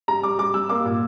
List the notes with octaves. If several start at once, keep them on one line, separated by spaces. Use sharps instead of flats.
G3 A#5
G3 D6
G3 D6
G3 E6
A#3 D6
A#2